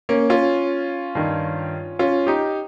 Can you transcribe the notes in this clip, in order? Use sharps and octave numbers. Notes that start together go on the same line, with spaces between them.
A#3 C#4
C#4 F4
G2 D#3
C#4 F4
D#4 G4